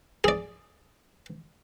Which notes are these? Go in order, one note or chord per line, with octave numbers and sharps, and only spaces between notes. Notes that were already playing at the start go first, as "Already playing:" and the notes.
G#4 D5